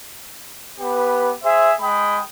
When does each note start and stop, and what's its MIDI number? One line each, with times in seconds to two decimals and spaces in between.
0.80 1.31 59
0.80 1.31 67
0.80 1.31 71
1.43 1.72 68
1.43 1.72 72
1.43 1.72 76
1.81 2.19 56
1.81 2.19 79
1.81 2.19 83
1.81 2.19 87